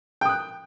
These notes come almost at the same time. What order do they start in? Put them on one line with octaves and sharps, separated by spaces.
G5 D#6 F#6